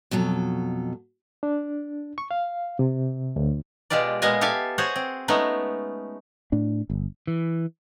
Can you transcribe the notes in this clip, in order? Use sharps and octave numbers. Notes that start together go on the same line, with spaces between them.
F2 B2 F#3 A4
D4
C#6
F5
C3
D2
B2 G#3 F4 G4 D5
A#2 G#3 B3 D#5 F5 G#5
G4 A4 E5 F5 G#5
F#4 G#4 C5 C#5 F#5
C4
G#3 A3 B3 C#4 D#4
A2 D4
G1
E3